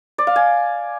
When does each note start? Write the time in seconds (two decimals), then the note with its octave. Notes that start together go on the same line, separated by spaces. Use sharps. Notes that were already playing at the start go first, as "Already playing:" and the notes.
0.18 D5
0.27 F5
0.36 G#5